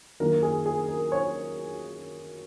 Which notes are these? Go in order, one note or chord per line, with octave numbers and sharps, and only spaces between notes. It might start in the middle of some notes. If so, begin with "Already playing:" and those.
F#2 D#3 A#3 A#4
G#4
G#4
A#4
C#5